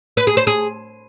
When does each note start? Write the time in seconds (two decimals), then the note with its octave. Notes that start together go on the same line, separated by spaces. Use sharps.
0.17 B4
0.27 G#4
0.37 C5
0.47 G#4